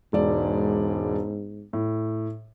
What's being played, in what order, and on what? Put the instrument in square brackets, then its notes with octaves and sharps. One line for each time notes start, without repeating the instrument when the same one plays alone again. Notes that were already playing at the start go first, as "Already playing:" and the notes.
[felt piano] E1 D5 [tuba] G#2
[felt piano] A2